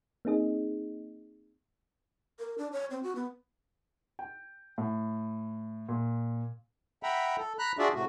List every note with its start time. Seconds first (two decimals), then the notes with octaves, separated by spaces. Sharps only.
0.25 A#3 C4 D#4 G#4 D#5
2.39 A#4
2.58 D4
2.72 C#5
2.91 C4
3.03 F#4
3.15 B3
4.19 G5
4.78 A2
5.89 A#2
7.03 E5 F#5 G5 A#5 B5
7.38 A4
7.59 A#5 B5 F#6
7.79 D4 F4 F#4 G#4 D5 E5
7.94 A2 C3 A3 F#4